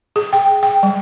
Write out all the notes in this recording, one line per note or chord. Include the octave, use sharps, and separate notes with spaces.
G#4
G5
G5
G3